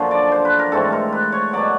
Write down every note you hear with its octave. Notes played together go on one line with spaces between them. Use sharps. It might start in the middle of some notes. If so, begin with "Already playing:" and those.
Already playing: F#2 D3 F3 A#3
D5
C5
B4
A#4
G#2 E3 A3 C4 A4
A#4
B4
C#5
B2 F#3 B3 D5